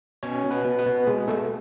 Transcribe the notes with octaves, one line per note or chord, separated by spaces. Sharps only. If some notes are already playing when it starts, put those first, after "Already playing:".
B2 C#4 C#5
B2
B3 B4
B2
B3 B4
B2
B2 G#3 G#4
B2 A3 A4